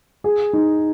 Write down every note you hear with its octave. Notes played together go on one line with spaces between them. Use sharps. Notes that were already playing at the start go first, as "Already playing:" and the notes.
G#4
D#4